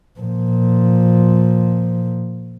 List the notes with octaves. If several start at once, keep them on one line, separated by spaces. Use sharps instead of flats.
A#2 F3